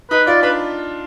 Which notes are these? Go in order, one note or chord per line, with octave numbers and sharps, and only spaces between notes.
D#4 B4
F4 D5
D4 B4